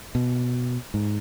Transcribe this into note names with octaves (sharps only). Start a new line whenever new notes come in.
B2
G#2